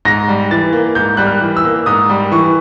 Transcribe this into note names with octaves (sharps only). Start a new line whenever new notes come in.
G#2 A#6
G3
E3 A6
A#3
G#2 G6
G3 F#6
F6
E3
E6
A#3
G#2 D#6
G3
E3 C#6